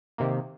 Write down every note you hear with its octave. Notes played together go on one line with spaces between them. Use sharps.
C3 D#3 A#3